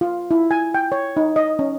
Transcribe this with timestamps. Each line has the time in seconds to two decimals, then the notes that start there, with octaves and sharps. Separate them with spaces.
0.01 F4
0.31 E4
0.51 G#5
0.74 G5
0.92 C#5
1.17 D#4
1.36 D#5
1.59 C#4